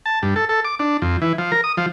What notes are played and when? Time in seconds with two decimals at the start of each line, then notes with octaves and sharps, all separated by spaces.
0.06 A5
0.23 G2
0.36 A4
0.49 A4
0.65 D6
0.79 D4
1.02 F2
1.22 E3
1.38 F3
1.52 A#4
1.64 D#6
1.77 F3